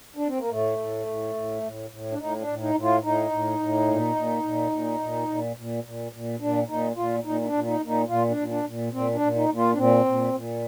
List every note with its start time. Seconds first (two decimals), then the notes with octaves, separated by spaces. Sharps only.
0.16 D4
0.27 C4
0.39 A#3
0.50 A2 A3
0.78 A2
1.06 A2
1.35 A2
1.62 A2
1.90 A2
2.12 D4
2.19 A2 D#4
2.40 D4
2.47 A2
2.61 D#4
2.74 A2
2.82 F4
3.03 A2 D#4
3.31 A2
3.59 A2
3.87 A#2
4.15 A#2
4.43 A#2
4.71 A#2
5.00 A#2
5.28 A#2
5.56 A#2
5.84 A#2
6.12 A#2
6.40 A#2 D4
6.68 A#2 D#4
6.96 A#2 F4
7.24 A#2 D#4
7.41 D#4
7.45 D4
7.53 A#2
7.66 D#4
7.80 A#2
7.87 D#4
8.08 A#2 F4
8.29 D4
8.36 A#2
8.50 D4
8.65 A#2
8.93 A#2 C4
9.14 D4
9.21 A#2
9.35 D#4
9.49 A#2
9.57 F4
9.73 D4
9.77 A#2 C4
10.05 A#2
10.33 A#2